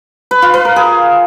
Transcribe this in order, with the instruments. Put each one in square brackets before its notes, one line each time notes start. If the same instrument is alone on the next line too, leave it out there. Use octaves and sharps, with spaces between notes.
[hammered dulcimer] B4
F4
B4
A#4
G#4